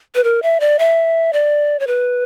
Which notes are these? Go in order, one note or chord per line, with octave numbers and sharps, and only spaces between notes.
B4
A#4
E5
D5
E5
D5
C#5
B4